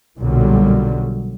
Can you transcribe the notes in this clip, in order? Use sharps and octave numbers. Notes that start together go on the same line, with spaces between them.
B1 A#2 D3 F#3 G3